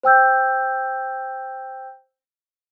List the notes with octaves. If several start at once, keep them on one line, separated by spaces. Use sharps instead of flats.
C5 G5 E6 G6